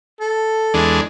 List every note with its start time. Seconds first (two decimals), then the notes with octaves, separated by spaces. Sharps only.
0.20 A4
0.74 E2 G#3 D4